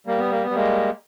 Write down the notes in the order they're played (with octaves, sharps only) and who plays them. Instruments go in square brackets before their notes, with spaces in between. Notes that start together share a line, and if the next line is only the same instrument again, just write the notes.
[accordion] G3 A#3
B3
A#3
B3
G3
G#3 A#3